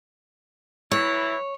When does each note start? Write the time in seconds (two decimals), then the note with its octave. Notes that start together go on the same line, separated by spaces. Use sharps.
0.92 E3 F#3 E4 C#5